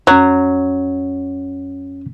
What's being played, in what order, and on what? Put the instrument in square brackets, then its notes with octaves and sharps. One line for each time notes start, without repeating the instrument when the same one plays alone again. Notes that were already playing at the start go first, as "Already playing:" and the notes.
[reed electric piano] F2 C#4 [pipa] F#3